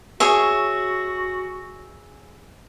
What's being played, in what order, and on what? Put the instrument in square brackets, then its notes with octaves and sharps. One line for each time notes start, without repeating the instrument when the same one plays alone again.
[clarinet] F#4 [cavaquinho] G#4 C#5 E5